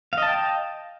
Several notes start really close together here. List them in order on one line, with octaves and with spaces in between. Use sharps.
F5 D#5 A5 G5